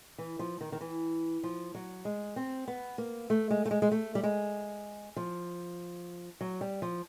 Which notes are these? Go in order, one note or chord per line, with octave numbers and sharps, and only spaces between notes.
E3
F3
D#3
D#3
E3
F3
F#3
G#3
C4
B3
A#3
A3
G#3
A3
G#3
G#3
A3
G3
G#3
F3
F#3
G3
F3